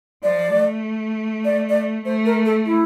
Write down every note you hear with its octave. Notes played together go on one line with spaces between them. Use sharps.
F3 D5
A3
D5
D5
A3 C5
A#4
A4
E4